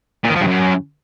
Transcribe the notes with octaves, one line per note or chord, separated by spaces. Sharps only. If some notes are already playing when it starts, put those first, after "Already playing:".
A#2
D#3
F3
G2
F#2